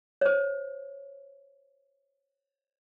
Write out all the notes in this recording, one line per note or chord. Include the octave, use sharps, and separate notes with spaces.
C5 C#5